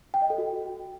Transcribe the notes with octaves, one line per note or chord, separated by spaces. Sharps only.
G5
D#5
A4
F#4